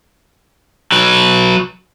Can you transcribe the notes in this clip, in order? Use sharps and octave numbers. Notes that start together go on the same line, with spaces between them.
F#3 B4